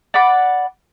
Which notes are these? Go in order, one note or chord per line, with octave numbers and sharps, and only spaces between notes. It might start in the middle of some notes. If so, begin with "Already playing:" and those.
D5 F#5 B5 D6